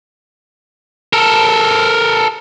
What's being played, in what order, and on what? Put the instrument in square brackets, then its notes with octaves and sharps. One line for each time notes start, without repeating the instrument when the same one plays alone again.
[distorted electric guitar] A4 A#4